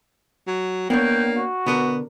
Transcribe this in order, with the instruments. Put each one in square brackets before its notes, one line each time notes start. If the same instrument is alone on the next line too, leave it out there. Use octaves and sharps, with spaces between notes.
[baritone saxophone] F#3
[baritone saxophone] A#3 [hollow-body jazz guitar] B3 D4 C#5 [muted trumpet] G5
[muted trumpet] F#4
[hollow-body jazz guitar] B2 D3 A#4 [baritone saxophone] B3